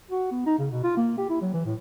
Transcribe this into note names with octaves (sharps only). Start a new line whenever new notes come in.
F#4
B3
D#4
C#3
B2
F4
A#3
G4
E4
F#3
E3
A2